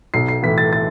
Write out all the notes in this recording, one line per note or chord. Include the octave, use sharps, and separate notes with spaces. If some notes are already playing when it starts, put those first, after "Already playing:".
B1 C7
C7
A2 E3 B6
A6
A6